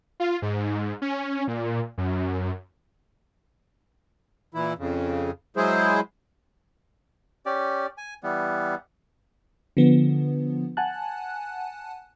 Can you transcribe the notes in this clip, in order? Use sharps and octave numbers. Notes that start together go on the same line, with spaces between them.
F4
G#2
C#4
A#2
F#2
A#2 E3 E4
F2 C#3
F#3 G#3 E4 G#4 C5
C#4 G4 D5
G#5
E3 G3 B3
D3 F3 B3
F#5 G#5 A5 F#6